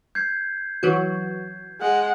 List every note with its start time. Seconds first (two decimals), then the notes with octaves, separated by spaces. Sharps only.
0.15 G6 G#6 C7
0.83 E3 F#3 F#4
1.80 G#3 F#5